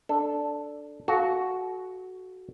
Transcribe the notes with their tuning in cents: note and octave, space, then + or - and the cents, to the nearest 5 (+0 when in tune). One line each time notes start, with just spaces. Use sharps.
D4 +0 A4 +0
F#4 +0 A4 -40 F5 +0